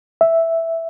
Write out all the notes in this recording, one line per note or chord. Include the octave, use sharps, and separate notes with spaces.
E5